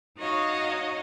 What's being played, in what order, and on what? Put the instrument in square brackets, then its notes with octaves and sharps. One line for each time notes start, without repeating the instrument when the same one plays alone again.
[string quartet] D#4 F#4 C#5 D#5 F5